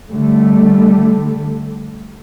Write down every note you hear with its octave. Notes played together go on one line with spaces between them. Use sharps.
D3 G3 A3